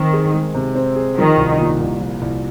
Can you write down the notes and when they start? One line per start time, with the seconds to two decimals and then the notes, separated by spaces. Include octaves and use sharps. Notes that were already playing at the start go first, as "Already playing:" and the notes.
Already playing: D#3 C4
0.13 G#4
0.33 G#3
0.55 C3
0.75 C4
0.96 G#4
1.17 D#3 F3
1.37 C2
1.59 A#2
1.80 C2
2.01 F3
2.22 C2